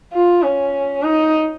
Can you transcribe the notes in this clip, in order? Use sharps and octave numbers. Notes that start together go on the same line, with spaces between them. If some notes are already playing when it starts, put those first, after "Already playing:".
F4
C#4
D#4